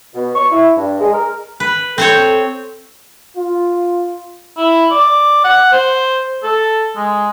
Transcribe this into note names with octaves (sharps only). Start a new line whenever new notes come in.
B2
C#6
E4
G2
G#3
A#4
B4
C4 A4 C5 C#5
F4
E4
D5
F#5
C5
A4
G#3